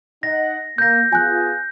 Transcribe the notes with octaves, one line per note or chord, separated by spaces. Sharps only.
D#4 D#5 F#5 A#6
A#3 G6 A#6
B3 F4 G#4 G#5 F#6